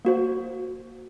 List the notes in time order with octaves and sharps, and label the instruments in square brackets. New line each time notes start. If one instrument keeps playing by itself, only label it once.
[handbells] A#3 F#4 C5